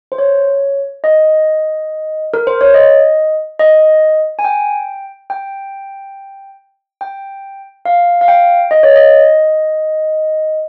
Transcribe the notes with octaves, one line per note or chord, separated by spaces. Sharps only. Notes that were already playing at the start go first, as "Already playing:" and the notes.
C5
C#5
D#5
A#4
C5
C#5
D#5
D#5
G#5
G5
G5
G5
F5
F5
G5
D#5
C#5
D#5